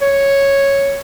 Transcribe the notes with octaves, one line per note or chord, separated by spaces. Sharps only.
C#5